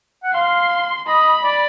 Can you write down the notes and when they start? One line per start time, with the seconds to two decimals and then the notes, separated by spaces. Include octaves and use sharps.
0.24 F#5
0.33 F5 C6
1.07 D#5 B5
1.44 D5